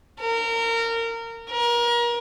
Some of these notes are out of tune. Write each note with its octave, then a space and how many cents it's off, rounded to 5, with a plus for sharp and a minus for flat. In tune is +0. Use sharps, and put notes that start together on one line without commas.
A#4 -25
A#4 +30